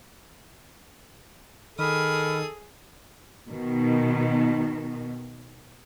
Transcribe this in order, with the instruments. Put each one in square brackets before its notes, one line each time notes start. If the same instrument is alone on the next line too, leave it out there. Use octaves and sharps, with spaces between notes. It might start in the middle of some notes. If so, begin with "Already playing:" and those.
[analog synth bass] D#3 [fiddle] G#4 D#6 [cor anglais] A4 [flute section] G5 B5 F6
[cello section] B2 D#3